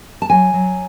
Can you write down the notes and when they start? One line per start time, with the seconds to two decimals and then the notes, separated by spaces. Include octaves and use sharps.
0.22 A5
0.30 F#3 G#5
0.54 F#3